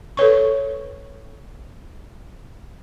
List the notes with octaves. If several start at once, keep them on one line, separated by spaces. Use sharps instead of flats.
A4 B4 C#5 C#6